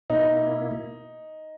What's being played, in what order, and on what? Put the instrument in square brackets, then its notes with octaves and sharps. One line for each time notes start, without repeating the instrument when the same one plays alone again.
[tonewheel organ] B2 A#3 E4 [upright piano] D#4